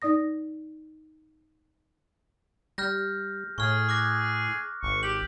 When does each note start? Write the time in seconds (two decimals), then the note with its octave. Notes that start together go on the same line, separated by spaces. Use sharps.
0.02 D#4 D5 D#6 A#6
2.78 G3 F6 G6 A#6
3.58 A2 G#4 C#6 F6
3.89 D6 F#6 A#6
4.83 G#1 C#6
5.03 G4 F#7